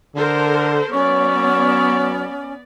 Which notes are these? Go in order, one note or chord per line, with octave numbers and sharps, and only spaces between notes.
D3 A4 A#4 C5
F#3 B3 C#4 C#5 D5